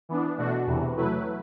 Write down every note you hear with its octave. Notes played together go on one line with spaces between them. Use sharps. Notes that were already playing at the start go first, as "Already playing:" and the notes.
E3 B3 D4
B2 A3 D4 F#4
E2 C3 E3
F#3 A3 E4 B4